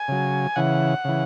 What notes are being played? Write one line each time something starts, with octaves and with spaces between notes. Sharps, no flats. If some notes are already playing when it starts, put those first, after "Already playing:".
Already playing: G#5
C#3 F#3
C#3 E3 F#5
C#3 E3